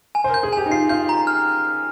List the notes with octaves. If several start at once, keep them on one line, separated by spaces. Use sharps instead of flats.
G#5
C5
A#4 G6
G#4
G4 G#5
D#4
F4 C7
F4 G6
A#5
F6